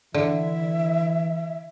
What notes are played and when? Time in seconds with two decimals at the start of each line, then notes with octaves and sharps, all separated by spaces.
0.14 D3 E3 E5